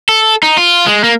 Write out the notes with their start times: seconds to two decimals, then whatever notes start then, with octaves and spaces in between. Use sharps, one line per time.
0.09 A4
0.43 D#4
0.57 F4
0.86 G#3
1.04 A#3